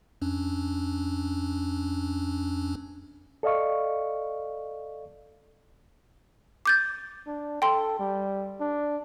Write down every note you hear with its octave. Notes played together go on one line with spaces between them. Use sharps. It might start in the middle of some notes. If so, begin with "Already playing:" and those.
F2 C#4 D4
A4 D5 D#5 F5 C#6
D6 G6 A6
D4
A4 G5 C6
G3
D4